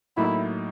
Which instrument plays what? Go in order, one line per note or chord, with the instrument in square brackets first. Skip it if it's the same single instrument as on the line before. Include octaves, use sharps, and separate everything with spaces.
[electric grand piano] A2 F#3 A#3 D#4 [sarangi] E4